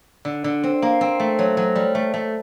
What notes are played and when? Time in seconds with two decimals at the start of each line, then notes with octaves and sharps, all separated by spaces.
0.25 D3
0.44 D3
0.63 C4
0.82 A#3
1.01 C4
1.20 A3
1.39 F#3
1.57 F#3
1.75 G3
1.95 A3
2.14 A3